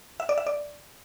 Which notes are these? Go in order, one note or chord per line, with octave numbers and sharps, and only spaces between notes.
E5
D5
E5
D5